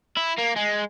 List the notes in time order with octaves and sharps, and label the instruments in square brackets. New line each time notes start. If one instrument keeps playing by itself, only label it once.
[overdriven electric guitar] E4
A#3
G#3